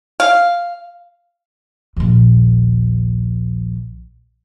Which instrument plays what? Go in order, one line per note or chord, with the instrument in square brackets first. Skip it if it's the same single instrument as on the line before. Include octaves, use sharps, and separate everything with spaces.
[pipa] F5
[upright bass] A#1 D#2